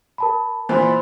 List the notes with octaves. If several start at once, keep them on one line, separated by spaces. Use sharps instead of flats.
A#4 A5 B5
A#2 E3 C5 B5 C6